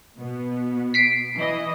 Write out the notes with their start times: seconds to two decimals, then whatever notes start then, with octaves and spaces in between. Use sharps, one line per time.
0.19 B2 B3
0.94 B6 C7 D7
1.36 E3 E4 D#5